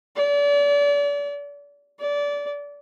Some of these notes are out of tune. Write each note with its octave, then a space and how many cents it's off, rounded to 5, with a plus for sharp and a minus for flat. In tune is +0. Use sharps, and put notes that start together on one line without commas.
D5 -35
D5 -25